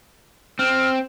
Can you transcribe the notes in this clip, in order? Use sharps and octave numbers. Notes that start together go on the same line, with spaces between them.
C4 F6